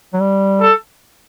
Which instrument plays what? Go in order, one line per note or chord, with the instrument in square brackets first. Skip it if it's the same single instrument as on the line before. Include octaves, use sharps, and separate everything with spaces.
[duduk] F#3
G3
[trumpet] A4